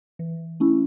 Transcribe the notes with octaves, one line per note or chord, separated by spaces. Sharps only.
E3
A3 C#4 E4